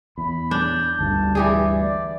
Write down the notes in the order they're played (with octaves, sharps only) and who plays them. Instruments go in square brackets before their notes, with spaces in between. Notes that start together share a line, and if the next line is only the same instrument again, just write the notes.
[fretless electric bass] E2 [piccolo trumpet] B5
[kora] D4 [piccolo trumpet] G6
[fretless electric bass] G1 D2 G2 [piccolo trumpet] A5
[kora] E3 G4 G#4 [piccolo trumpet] D5
[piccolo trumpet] D5